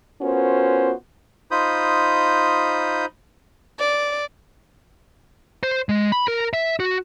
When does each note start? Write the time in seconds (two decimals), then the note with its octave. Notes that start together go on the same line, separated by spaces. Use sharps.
0.21 B3 C#4 F4 F#4 A#4 C5
1.51 D#4 F4 C5 B5 D#6 G6
3.80 D5
5.63 C5
5.89 G#3
6.12 B5
6.28 A#4
6.53 E5
6.80 F#4